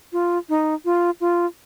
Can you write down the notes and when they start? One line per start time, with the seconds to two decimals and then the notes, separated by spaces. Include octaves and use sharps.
0.13 F4
0.49 D#4
0.85 F4
1.21 F4